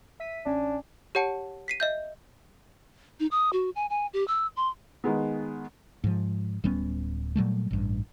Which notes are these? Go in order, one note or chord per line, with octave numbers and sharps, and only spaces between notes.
E5 B6 D#7
A1 C#4 D4 G#5
G4 C#5 F#5 A5 C#7
B6 C7 D#7
D#5 E5 G6
D#4
D#6
F#4
G#5
G#5
G4
E6
C6
D#3 G#3 B3
G#2 F3
D1 G3 B3 C#4
A#2 F#3 G3 A3
A1 G2